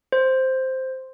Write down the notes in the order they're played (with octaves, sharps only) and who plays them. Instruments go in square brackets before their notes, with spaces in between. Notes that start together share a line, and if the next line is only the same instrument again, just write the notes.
[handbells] C5